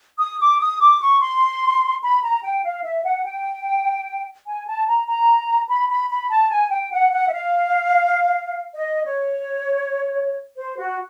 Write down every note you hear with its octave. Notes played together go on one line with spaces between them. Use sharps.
D#6
D6
D#6
D6
C#6
C6
B5
A#5
G5
F5
E5
F#5
G5
G#5
A5
A#5
A#5
B5
B5
B5
A5
G#5
G5
F#5
F#5
E5
F5
D#5
C#5
C5
F#4